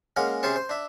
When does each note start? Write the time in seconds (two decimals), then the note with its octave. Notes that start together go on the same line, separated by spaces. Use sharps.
0.16 G#3 A#3 C#4 A#4 F#5
0.43 C3 C#4 G#4 C5 A5 C#6
0.56 C5
0.69 D4 E5